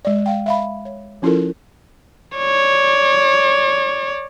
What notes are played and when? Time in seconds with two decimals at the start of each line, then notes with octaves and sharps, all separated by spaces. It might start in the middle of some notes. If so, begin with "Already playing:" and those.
0.05 G#3 D5
0.26 F5 G5
0.46 E5 F5 B5
0.85 C#5
1.22 F3 C#4 E4 F4 A4 A#4
2.37 C#5 D5